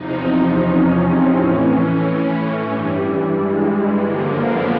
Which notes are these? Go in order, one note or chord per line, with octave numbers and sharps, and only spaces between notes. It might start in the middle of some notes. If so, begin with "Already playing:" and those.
Already playing: E2 C3 F3 D#4
C#4
C4
A2 E3 C#4
G2 E3 G3
G#3
F#2 D3 F3 A#3
B3